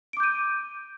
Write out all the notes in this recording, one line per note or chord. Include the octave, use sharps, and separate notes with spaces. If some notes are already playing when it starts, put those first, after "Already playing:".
D6 G6 D7 D#7